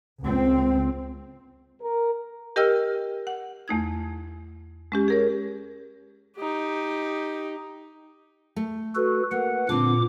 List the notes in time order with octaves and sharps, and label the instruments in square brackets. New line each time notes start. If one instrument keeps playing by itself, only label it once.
[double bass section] C#2 C4
[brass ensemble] A#4
[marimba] G4 A#4 D#5 G5 E6 F6
F#5
E2 A3 D#4 G#6
G#3 C#4 G4
G#4 A#4 C#5
[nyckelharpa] D#4 G4
[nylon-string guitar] A3
[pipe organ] F#4 A4 B4
[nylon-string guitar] A#3 [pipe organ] B4 F#5
[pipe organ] A#2 D6 [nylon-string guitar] D3 C4